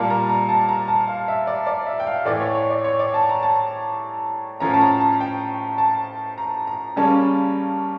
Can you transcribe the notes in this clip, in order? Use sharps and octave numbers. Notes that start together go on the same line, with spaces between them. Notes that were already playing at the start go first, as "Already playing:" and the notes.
Already playing: A#2 G3 A#3 A5
A#5
A#5
A5
A#5
A5
F5
E5
D5
D5
E5
G5
F5
A2 E3 A3 D5
C#5
C#5
D5
C#5
D5
A5
A#5
A5
A2 F3 C#4 A#5
A5
A#5
A5
G5
A5
A#5
A#5
C#3 G3 A#3 C#4 A5